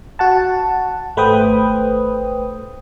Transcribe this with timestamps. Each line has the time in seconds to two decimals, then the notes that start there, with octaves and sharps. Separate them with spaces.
0.19 F#4 F#5 A5
1.17 G#1 A3 B4 C5 G5 D#6